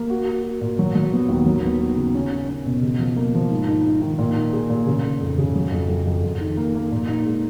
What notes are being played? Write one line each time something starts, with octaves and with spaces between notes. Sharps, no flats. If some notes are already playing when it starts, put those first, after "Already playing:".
Already playing: A#3
F#4
F#4
F#4
A#2
F#3
F#3
B3
D#2
F#3
B3
B3
C#3
C#4
C#4
C#4
B2
C#3
F3
A#3
F3
G#2
D#4
D#4
D#3
A#2
D#4
G#4
A#2
C#3
C#3
F2
C#3
F#3
F2
F2
F2
F2
D#3
A#3
A#3
A#2
D#4
G#3